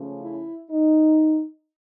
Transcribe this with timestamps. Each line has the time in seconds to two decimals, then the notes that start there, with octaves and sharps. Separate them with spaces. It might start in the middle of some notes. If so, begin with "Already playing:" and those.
Already playing: C#3 F3 A3 C#4
0.21 E4
0.70 D#4